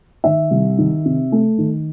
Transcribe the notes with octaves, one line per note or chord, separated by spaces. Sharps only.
D#3 E5
C2
D#3
C3
A3
D#3